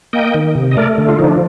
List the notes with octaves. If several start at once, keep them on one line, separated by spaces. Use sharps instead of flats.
A#3 D#5 G5
D#3
C3
D#5
A3 A#4 D5
D3
F4
F3 D#4
D4